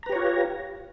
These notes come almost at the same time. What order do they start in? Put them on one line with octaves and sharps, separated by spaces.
A#5 B4 G4 C#5 F4